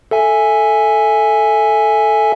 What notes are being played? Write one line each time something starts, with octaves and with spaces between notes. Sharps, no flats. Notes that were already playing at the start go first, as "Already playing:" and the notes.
A4 E5 G#5